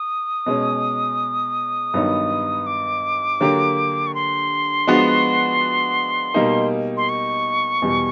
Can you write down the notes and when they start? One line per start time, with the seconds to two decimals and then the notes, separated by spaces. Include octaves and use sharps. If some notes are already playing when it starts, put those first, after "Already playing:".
Already playing: D#6
0.46 B2 G#3 C#4
1.94 G2 D#3 F#3 B3 D#4
2.67 D6
3.40 D3 F#3 A#3 D4 G4
4.07 C#6
4.15 C6
4.87 F3 G#3 B3 D4 F#4
6.34 B2 G3 A#3 D#4
6.97 C6
7.09 C#6
7.82 E2 B2 G3